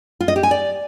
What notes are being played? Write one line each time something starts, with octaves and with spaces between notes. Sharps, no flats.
F4
D#5
G4
G#5
D5